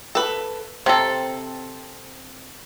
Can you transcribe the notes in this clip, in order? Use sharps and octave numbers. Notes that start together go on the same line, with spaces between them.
A4 B4
C3 C4 A4 A#5